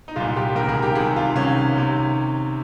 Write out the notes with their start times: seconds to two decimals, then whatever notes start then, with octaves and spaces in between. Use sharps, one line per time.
0.08 D#4
0.16 C2 A#2 F4
0.36 G4
0.55 C#2 C3 D#3 A#4
0.69 G#4
0.83 G4
0.95 C2 C3 D#3 G#4
1.16 F4
1.35 C2 C3 D#3 C#4
1.77 C3 D#3